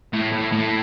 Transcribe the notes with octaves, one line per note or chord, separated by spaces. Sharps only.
A2
A2
A2